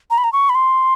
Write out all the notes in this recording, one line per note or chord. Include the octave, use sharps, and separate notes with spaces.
A#5
B5
A#5
C#6
B5
C6